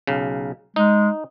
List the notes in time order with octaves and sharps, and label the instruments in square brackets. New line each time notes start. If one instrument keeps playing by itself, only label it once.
[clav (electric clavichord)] B1 C#3
[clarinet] G#3 [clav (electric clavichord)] D#4